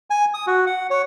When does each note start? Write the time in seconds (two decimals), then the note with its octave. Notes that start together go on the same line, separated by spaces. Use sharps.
0.10 G#5
0.34 D#6
0.47 F#4
0.67 F#5
0.90 C#5